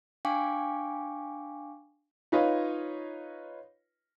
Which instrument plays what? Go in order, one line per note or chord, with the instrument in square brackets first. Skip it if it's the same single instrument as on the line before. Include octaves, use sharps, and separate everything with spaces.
[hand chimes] D4 F5 G5 G#5 C#6 D6
[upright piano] D#4 F4 B4 C#5 D#5 F5